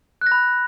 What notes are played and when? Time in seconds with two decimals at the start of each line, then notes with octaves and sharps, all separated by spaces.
0.21 F#6
0.27 A#6
0.32 B5